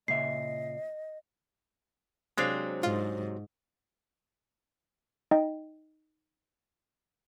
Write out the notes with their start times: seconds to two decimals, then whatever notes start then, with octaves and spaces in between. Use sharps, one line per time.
0.08 A#2 C#3 D#5 E5 C7
2.38 C3 F#3 G#3 C4 D4 F5
2.83 G#2 F4
5.31 D#4 D#5 G5